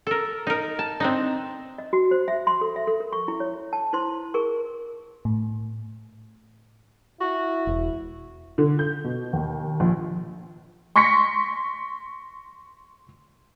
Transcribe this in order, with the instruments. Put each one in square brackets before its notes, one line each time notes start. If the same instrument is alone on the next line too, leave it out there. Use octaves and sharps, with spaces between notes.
[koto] A4 A#4
D#4 A#4
A5
C4 D4 D#4
[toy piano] D#5
F#4
C5
E5
C6
A4
E5
A4
A#4
C#6
E4
C#5
A5
E4 C5 C6
G#4 A#4 C#6
[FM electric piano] A2
[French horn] E4 [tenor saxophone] F#4
[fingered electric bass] E1
[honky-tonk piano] D3
G6
B2
D#2
A#1
C6 C#6 A#6 B6 C#7